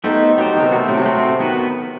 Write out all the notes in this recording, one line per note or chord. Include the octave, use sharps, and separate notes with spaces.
A3 B3 D#4 G4 C5
F#3 B3 D#4 G4 C5
D#3
C3
B2 A3 C4 F#4
A2
C3
A3 C4 F#4
D#3 B3 F#4 B4